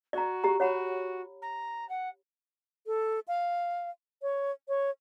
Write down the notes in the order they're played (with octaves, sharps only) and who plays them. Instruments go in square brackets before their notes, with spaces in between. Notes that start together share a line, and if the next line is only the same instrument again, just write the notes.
[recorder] F#4 [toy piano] D5 A#5
[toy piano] G4 A#5
[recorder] F#4 [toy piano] C#5 F#5 B5
[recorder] A#5
F#5
[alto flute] A4
F5
C#5
C#5